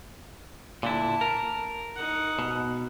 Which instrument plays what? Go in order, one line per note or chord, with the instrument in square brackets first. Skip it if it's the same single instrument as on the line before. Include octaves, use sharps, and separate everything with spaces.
[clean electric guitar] A#2 D3 E4 [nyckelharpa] A5
[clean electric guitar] A#4
[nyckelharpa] D#4 F#5
[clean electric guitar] B2